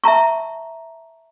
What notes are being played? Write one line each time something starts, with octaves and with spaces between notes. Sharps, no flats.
E5 A5 A#5 C#6